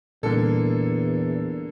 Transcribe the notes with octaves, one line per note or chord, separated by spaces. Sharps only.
E2 A#2 D3 G3 A#3 A4